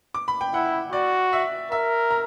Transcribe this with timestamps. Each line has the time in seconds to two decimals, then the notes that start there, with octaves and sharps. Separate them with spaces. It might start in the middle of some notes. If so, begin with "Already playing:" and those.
0.14 D6
0.28 B5
0.41 G5
0.54 E4 F#5
0.92 F#4 D5
1.33 E5
1.71 A#4 E5
2.11 A#5